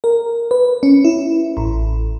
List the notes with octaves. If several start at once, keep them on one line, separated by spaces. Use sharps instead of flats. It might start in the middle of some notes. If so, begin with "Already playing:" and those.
A#4
B4
C#4
E4
A1